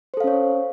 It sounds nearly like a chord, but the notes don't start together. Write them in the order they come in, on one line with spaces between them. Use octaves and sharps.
C5 A4 F5 C#4 C#5